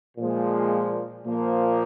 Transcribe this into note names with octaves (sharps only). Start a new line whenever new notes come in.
A#2 F3 G#3
A#2 F3 A#3